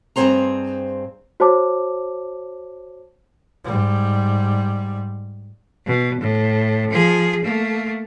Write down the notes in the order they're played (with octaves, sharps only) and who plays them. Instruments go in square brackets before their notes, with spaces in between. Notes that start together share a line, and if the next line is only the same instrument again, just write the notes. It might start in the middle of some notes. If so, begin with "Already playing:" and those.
[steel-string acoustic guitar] G2 C3 C4 G#4 C5 A#5
[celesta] F#4 C5 C#5 A5 D6
[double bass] G#2 G3
[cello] B2
A2
F3 G#4
A3 A#3